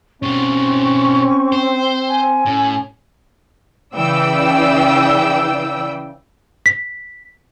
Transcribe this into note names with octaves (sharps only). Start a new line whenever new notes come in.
B2 G3 C4 C#4 C#6
C5
G#5
A2 C#4
C#3 E3 D5 G5 E6
B6